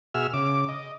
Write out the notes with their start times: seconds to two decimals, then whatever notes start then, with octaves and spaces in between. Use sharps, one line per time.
0.14 B2 F#4 G#4 E5 E6 F6
0.33 C#3 D6
0.69 D#5